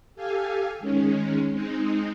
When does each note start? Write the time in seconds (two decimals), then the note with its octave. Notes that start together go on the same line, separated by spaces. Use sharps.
0.15 G4 A4 F5 G#5
0.80 D#3 G#3 C#4
1.50 G#3 C4 D#4